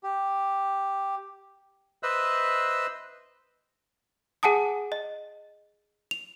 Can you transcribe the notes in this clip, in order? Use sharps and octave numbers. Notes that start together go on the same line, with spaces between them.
G4
B4 C5 D#5 E5 E6 F#6
G#4 F#5 G#5 A5 D#6
D#5
F7